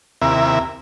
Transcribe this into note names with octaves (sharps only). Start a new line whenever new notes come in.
D#2 C3 E4 A#4 E5